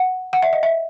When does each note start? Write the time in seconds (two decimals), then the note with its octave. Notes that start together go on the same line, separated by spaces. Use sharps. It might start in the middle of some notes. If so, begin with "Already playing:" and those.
Already playing: F#5
0.33 F#5
0.42 E5
0.53 D#5
0.63 E5